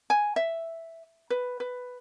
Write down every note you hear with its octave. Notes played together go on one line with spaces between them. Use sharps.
G#5
E5
B4
B4